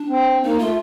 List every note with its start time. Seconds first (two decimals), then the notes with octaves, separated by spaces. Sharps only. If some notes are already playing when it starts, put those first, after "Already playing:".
Already playing: D4
0.09 C4
0.43 A#3 D#4
0.58 A3 F4